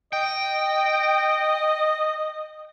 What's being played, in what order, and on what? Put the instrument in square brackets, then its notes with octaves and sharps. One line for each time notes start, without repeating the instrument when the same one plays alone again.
[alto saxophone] D#5 [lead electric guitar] G5